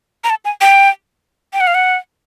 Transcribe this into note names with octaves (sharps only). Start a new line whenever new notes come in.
A#5
A5
G#5
G5
G5
F#5
F5
F#5